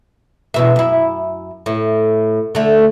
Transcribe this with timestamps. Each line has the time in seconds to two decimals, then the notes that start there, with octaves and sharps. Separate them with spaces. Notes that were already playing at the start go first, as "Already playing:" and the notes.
0.54 E2 B2 E5
0.76 F#2 E4
1.66 A2
2.55 D3 A3